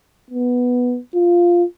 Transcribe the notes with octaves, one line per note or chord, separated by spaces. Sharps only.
B3
F4